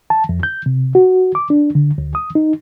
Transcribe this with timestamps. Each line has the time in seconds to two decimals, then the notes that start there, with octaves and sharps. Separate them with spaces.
0.10 A5
0.29 F2
0.43 G6
0.66 C3
0.95 F#4
1.35 D6
1.50 D4
1.75 D3
1.98 D2
2.15 D#6
2.35 D#4